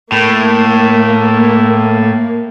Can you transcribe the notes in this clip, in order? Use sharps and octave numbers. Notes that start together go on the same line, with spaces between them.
A2 A#3